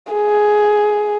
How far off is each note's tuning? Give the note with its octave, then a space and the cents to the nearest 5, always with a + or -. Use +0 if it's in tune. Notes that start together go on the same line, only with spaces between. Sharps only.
G#4 +10